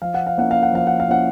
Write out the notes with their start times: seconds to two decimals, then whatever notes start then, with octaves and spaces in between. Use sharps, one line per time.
0.02 F3 F5
0.14 F#5
0.27 F5
0.38 A#3 C#4 E4 F#5
0.51 F5
0.63 F#5
0.73 F3 F5
0.87 F#5
1.00 F5
1.08 A#3 C#4 E4 F#5